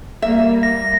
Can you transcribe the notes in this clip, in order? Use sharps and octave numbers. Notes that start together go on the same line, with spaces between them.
G3 A#3 E5
A#6